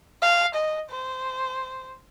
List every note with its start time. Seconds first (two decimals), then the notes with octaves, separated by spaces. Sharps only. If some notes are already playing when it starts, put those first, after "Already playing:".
0.22 F5
0.55 D#5
0.90 C5